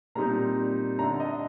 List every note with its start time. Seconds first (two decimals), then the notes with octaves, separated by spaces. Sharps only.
0.15 A#2 G3 C4 D#4 A#5
0.99 D3 A3 D4 A#5
1.20 D#5